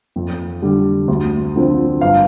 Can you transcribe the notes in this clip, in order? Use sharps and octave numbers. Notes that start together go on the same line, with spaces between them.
F2
D3 G3
D2
D3 F3 C4
G1 F5